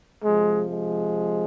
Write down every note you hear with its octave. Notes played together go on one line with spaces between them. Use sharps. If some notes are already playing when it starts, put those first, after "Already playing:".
C3 F3 G#3
G#3